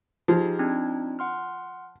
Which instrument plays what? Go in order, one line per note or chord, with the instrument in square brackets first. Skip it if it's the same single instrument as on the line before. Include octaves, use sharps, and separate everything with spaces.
[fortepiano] F3 [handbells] D#4 G4 G#4
[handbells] C4 D4 D#4
F#5 C6 F6